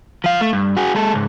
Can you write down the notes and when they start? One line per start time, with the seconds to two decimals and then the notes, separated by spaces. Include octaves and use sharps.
0.24 F3 F5
0.41 A3
0.53 G2
0.77 F#4 G#4
0.95 G#3 A4
1.13 C#2 G#2